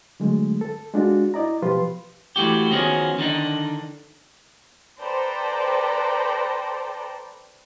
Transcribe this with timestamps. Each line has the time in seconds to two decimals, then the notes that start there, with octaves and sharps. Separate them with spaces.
0.20 D3 F#3 G#3 A3
0.61 A4
0.94 G#3 D4 F4 F#4
1.34 E4 D5 D#5 A#5
1.62 B2 F3 F4 G4 B4 C6
2.36 E3 A3 F#4 G4
2.71 D#3 F3 B3 C#4 F#4 G#4
3.18 D3 D#3 D4 D#4
5.01 A4 B4 C5 D5 G5 A#5